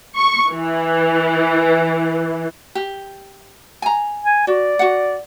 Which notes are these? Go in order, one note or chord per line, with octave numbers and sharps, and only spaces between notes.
C#6
E3
G4
G#5 A#5
G#5
F#4 D5
F#4 F#5